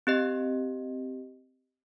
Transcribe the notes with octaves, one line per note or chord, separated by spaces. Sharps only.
C4 G4 D#5